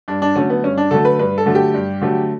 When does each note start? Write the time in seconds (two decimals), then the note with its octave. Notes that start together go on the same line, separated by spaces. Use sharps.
0.08 G2 D4
0.22 D4
0.36 D3 F#3 A3 C#4
0.50 B3
0.64 G2 C#4
0.78 D4
0.91 D3 F#3 A3 A4
1.05 B4
1.19 G2 B4
1.38 A4
1.46 D3 F#3 A3
1.55 G4
1.74 G2
2.01 D3 F#3 A3